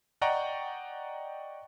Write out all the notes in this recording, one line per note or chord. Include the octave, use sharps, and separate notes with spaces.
D5 D#5 F#5 G5 A#5 C#6